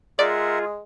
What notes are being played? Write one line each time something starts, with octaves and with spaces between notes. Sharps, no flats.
G#3 F4 G#4 A#4 D5 E5 F#5